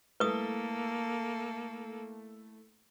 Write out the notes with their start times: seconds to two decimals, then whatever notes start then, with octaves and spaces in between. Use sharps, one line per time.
0.20 A3 A#3 E4 A4 B4 D#6 G7